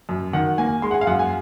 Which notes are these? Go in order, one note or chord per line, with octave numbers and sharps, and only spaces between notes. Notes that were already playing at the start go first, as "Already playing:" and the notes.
F#2
D#3 F#5
A#3 G#5
G#3 C6
F#5
G#5
F5
F#2 F#5
G#5